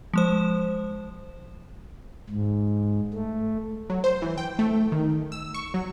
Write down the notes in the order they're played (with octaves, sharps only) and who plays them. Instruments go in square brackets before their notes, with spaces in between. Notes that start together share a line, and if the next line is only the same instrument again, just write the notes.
[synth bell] F3 G#3 C5
[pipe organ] G#2
A3
[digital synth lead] F#3
C5
E3
G5
A3
D#3
E6
C#6
F#3